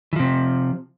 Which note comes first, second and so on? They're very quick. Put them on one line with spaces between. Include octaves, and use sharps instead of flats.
E3 F3 C3